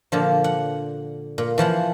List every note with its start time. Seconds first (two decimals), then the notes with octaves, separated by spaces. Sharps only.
0.12 A#2 D3 F3
0.44 F#5
1.38 A#2
1.58 E3 F3 F#5 C6